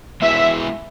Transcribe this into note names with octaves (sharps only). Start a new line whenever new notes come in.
G#3 B3 E4 B4 E5